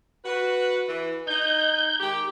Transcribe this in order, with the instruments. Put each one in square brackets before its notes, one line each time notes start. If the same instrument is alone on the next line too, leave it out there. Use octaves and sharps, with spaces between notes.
[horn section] F#4 B4
E3
[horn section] D#4 [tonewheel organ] G6
[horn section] D#3 G#3 G4